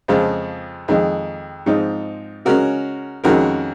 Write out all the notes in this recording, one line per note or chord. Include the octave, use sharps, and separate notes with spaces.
F2 C#3 F3 G#3
F2 D#3 G#3 D#4
G#2 F3 C4 D#4
C#3 G#3 C#4 F#4 A#4
F2 D#3 G#3 C#4 F#4 A#4